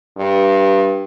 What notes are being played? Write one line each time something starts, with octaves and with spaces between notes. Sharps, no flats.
G2